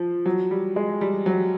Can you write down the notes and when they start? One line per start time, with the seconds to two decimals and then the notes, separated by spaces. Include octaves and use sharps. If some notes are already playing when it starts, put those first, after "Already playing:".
Already playing: F3
0.26 F#3
0.51 G3
0.76 G#3
1.01 G3
1.26 F#3